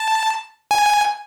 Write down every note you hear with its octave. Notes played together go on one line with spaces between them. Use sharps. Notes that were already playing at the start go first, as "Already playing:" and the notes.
Already playing: A5
G#5